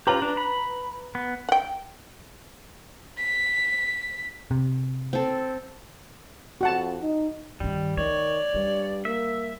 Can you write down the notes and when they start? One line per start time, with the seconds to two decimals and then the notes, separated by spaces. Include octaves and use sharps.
0.07 F4 G4 B4 A#5 F#7
0.22 D4
0.37 B5
1.15 B3
1.49 F#5 G5
3.18 B6
4.51 C3
5.13 C4 A4
6.61 F2 F#4 F#5 A5
7.02 D#4
7.60 G2 D#3 G3
7.97 D#3 A3 C#5 D5
8.55 G2 G3
9.05 A#3 E5